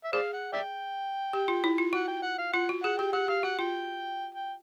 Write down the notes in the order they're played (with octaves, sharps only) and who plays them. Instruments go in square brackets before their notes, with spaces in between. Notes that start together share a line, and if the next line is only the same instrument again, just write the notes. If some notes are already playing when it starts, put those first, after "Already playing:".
[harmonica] E5
[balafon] G#4 [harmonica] C5 D5 F5
[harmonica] F#5
D5 E5 G5
[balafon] G4
F4
E4
F4
[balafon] F#4 [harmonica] F#5
[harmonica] G5
F#5
F5
[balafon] F4 [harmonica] F#5
[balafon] F#4
[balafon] G#4 [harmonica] F#5
[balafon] G4 [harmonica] G5
[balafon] G4 [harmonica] F#5
[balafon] G4 [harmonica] F5
[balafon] F#4 [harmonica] F#5
[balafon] F4 [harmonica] G5
[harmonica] G5